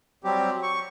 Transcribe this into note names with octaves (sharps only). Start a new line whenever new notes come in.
F#3 G3 C4 G4
C#6